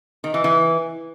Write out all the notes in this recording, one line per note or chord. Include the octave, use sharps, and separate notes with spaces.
D#3
E3
E3